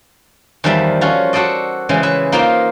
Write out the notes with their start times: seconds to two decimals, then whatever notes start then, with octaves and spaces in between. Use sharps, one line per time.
0.64 E2 D#3 F3 G3 E5
1.01 F3 C#4 F4 F#4
1.33 F#4 A4 C5 D5 D#5
1.89 C#3 E3 G#3
2.03 B4 E5
2.32 A#3 D#4 F4 C5 F5 G5